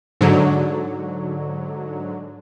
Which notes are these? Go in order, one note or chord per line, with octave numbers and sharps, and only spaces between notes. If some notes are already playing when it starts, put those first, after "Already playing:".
G#2 D3 F#3